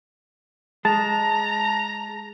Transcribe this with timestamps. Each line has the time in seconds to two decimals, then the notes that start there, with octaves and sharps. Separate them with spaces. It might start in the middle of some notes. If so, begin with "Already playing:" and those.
0.85 G#3 A5 A#5